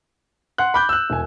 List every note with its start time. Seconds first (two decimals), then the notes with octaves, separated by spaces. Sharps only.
0.58 F#5 C6 F#6
0.74 B5 D6 F#6 G6
0.89 E6 F#6
1.10 E1 G#5